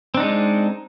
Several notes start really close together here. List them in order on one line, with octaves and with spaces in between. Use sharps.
C4 D4 D#4 G#3